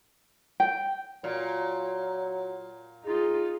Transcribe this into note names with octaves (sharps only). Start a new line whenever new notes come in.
G5
A#2 F#3
D#4 F4 G#4